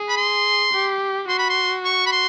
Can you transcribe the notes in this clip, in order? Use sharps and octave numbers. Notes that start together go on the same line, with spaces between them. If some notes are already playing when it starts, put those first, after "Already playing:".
Already playing: G#4
B5
C6
G4
F#4 C6
B5
C6
C#6
B5
C6